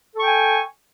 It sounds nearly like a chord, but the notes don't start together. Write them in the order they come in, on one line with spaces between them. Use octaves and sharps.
A4 C#6 G5 G#5